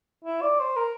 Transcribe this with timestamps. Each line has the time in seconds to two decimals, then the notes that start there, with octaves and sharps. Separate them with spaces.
0.25 E4
0.42 D5
0.60 C5
0.77 A#4